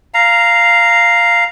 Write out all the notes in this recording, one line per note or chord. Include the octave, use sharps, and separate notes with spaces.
F5 A#5